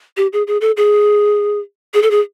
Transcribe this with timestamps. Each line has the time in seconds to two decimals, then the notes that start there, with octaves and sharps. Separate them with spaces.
0.17 G4
0.33 G#4
0.47 G#4
0.61 A4
0.77 G#4
1.94 G#4
2.02 A4
2.11 G#4